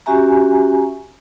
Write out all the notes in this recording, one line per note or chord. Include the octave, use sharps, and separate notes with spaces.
C#4 F#4 G4 E5 G#5 A#5